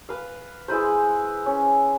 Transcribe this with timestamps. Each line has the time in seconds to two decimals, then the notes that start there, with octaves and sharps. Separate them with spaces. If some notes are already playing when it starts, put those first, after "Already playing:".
0.09 B4 F5
0.68 G#3 E4 B4 C5
1.46 C#4